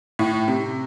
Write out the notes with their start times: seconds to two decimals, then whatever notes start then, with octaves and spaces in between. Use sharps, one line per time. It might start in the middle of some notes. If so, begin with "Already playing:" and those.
0.19 A2
0.48 C3